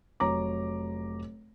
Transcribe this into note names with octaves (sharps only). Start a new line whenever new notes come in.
F1 F#3 C#5 A#5 D6